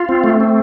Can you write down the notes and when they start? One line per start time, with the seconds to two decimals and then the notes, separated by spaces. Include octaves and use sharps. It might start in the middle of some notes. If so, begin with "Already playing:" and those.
Already playing: F4
0.09 C4
0.24 A3
0.40 C4